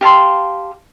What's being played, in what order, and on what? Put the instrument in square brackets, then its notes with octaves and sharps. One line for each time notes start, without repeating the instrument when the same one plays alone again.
[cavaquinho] G4 F5 A5 C6